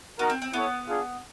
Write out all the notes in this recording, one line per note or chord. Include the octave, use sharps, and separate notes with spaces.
B3 D#4 F#4 A#4
C4
C4
B3 E4 A4 C#5
D4 F4 G#4